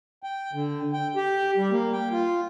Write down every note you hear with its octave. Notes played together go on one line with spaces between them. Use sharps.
G5
D3
G5
G4
G3
A#3
G5
F4